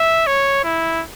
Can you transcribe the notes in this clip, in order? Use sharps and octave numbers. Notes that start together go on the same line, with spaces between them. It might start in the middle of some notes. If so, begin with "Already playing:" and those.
Already playing: E5
C#5
E4